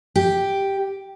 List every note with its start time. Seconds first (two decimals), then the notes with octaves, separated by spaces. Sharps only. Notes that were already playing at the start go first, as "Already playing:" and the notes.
0.16 G4